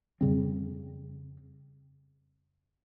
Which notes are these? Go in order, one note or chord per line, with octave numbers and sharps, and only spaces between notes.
F2 C#3 G3 C4